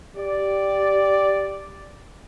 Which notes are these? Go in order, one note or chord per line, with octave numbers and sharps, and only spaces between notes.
G4 D5